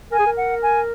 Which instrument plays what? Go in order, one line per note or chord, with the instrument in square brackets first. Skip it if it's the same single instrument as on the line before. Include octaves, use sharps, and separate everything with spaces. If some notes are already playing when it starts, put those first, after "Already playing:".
[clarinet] A#4 [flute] G#5
[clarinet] G#4
A#4
[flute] F#5
G#5